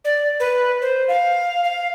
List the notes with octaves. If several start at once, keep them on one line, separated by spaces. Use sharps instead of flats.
D5
B4
C5
F5
F5